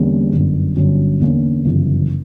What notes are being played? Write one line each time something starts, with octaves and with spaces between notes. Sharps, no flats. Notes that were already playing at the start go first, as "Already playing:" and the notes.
Already playing: E2 D3 G3 A#3 C#4
G1 F#2 D3
G1 G2 D3 F#3 C#4
E2 D3 A#3 C#4
G1 F#2 C#3 E3